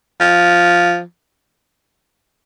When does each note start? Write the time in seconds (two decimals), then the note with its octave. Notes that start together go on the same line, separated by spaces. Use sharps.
0.20 F3